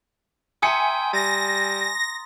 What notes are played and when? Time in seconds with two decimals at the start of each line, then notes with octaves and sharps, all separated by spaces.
0.62 E5 G5 G#5 A#5 C6 D#6 C#7
1.13 G3 A6 A#6